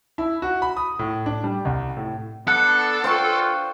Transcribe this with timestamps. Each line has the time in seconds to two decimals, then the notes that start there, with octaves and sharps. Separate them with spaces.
0.18 E4
0.42 F#4
0.62 B5
0.77 D#6
0.99 A2
1.26 D4
1.44 G3
1.65 C2
1.97 A2
2.48 B3 D4 A4 F#5
3.04 D4 F4 C5 G5 C#6